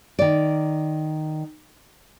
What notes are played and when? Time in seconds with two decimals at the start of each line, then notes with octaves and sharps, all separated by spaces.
0.19 D#3 D5